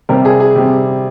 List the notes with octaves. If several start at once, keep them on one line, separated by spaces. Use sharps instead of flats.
C3 G3 C4 A#4
G#4
G#4
C3 G3 C4